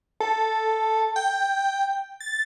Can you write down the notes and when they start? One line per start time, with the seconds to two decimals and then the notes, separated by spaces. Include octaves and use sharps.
0.20 A4
1.16 G5
2.20 A6